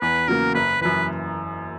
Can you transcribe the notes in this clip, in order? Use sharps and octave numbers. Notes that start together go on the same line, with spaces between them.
E2 B4
C#3 F#3 A#3 A#4
F#1 B4
F#2 E3 B4